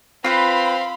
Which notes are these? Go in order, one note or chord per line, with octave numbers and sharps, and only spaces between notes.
C4 F4 B4 C5 F5 B5 C6